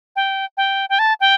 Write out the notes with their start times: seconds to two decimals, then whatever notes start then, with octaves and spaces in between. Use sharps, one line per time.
0.16 G5
0.57 G5
0.89 G5
0.99 A5
1.20 G5